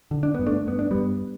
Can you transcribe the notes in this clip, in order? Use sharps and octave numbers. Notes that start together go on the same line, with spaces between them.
D3
D4
G2 B3
A3 D4
G2 B3
D4
G2 G3 B3